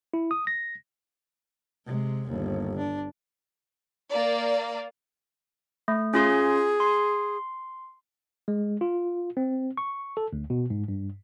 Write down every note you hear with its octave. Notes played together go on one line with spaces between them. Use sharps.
E4
D#6
A#6
C3 G#3
G1 D#2
D4
A#3 D5
A3
C#4 F4 G#4 C6
C6
G#3
F4
C4
C#6
A4
D2
B2
G#2
G2